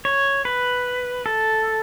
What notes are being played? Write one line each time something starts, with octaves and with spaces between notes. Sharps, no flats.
C#5
B4
A4